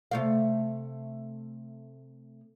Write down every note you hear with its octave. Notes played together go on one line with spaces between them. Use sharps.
C3 A3 F5